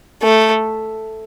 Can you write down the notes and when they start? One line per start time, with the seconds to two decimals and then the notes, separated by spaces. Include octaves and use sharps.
0.23 A3